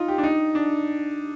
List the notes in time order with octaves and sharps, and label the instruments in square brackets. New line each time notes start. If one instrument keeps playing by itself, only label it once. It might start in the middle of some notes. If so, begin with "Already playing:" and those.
Already playing: [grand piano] D#4 F4
G4
D4
D#4
D4